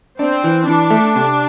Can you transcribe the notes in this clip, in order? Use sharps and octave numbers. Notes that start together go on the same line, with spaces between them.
C4 D4
E3
E3 D4
A3
C3